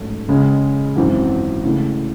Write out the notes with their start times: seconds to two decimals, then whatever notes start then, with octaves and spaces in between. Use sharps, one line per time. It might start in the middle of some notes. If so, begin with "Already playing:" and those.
Already playing: A1 G#2 F#3 A3 C#4
0.28 C#2 C#3 G#3 C#4
0.95 G#1 F#2 E3 C4
1.63 C#2 C#3 E3 A3